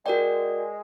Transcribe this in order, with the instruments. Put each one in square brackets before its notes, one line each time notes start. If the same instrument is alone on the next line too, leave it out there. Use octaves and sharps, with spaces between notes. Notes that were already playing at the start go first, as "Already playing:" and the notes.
[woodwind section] G#3 [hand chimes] F#4 A#4 D5 G5